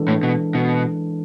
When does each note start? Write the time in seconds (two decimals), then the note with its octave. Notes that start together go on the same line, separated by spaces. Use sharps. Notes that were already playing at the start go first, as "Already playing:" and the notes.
Already playing: E3 G#3 D4 A4
0.08 A2
0.23 B2
0.55 B2